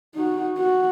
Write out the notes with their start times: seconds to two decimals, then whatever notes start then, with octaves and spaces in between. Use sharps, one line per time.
0.15 D#4 F#4
0.57 F#4